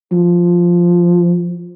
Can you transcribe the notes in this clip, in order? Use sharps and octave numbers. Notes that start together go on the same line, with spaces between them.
F3